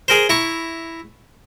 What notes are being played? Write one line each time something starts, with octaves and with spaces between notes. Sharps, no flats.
G#4 A#4 C5
E4 A#5 C#6